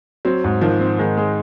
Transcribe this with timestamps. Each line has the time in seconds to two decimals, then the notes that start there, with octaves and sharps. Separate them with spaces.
0.25 F#3 C4
0.44 G#2
0.61 D#3 F3
0.80 C4
0.99 D#3 G#3
1.17 G#3